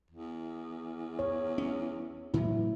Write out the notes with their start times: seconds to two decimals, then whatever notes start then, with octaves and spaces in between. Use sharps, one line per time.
0.10 E2
1.19 C#5
1.58 C#4
2.34 A2 E3 F#3 E4